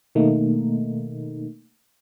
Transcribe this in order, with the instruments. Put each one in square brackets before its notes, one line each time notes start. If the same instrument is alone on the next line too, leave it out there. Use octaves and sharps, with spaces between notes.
[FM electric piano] B2 D#3 A3 A#3 D#4